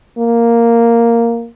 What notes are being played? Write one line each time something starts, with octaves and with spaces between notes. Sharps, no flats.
A#3